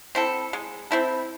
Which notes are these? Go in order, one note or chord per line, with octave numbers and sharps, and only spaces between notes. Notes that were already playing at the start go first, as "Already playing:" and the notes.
C4 E4 A4
G#3
C4 E4 A4